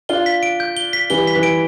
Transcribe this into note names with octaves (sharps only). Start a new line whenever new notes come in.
D4 F4 G7
B6
D7
G6
G7
B6
E3 G3 G7
B6
E3
D7